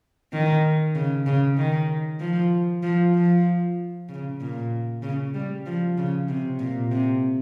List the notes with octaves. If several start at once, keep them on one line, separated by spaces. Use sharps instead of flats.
D#3
C#3
C#3
D#3
F3
F3
F3
C#3
A#2
C#3
G3
F3
C#3
C3
A#2
C3